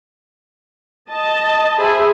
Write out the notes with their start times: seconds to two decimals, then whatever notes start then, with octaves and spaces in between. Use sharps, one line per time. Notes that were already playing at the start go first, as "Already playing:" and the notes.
1.08 D#5 A5
1.78 G#4 C5 E5 B5